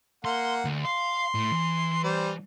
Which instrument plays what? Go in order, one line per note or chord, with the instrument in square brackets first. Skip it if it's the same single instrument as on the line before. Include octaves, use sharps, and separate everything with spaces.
[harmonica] A#3 F#5 [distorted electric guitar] C6
[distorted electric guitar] D2
[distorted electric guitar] F5 [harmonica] C6
[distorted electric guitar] A2
E3
[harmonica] G3 C5